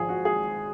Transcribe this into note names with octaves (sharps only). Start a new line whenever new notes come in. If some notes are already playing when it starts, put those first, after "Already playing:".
Already playing: G#1 G#2 F3 G#3 G#4
F#4
G#4